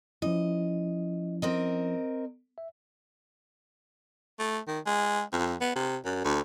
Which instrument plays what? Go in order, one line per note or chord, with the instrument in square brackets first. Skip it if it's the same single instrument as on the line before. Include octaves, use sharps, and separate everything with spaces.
[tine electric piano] F3 C#4 E4 [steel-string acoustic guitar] D#5
[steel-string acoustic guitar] C4 A#4 D#5
[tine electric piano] E5
[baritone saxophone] A3
D#3
G#3
F2
B3
C3
F#2
D2